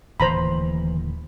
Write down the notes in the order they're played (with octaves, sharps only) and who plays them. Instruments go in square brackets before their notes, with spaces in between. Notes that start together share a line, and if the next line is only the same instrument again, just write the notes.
[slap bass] D1 D#2 A2 [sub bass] E3 [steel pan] C5 A#5 B5